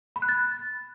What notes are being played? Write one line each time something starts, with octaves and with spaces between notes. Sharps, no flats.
B5
F#6
A6